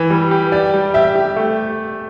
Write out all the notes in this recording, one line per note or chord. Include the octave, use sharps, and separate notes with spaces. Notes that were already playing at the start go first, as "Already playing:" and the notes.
Already playing: E3 B4
G3
G4
G4 D5
G3
G4 E5
G4
A3